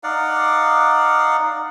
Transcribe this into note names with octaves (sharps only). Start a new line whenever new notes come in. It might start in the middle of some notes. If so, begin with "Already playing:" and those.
D#4 D5 F5 F#5